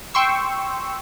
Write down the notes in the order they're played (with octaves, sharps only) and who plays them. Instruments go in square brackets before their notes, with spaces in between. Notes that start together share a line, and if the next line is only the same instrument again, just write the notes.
[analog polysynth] G5 C6 C#6 E6